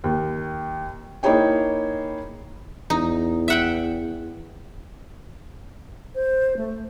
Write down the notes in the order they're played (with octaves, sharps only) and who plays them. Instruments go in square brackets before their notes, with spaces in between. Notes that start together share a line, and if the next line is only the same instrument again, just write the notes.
[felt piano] D#2
A#3 D#4 E4 G#4 C#5 G5
[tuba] E2 [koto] D#4
[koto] E5 F#5 G5
[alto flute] C5
A3